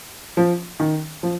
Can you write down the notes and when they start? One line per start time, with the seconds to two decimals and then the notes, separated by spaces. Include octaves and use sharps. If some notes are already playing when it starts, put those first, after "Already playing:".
0.37 F3
0.80 D#3
1.23 F3